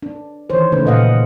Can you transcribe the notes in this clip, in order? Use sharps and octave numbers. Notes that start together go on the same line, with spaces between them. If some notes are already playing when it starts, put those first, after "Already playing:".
D4
D#3 E3 C5 C#5
C#3 A3 C#4 D#4 B4
A#2 D#5 F5 F#5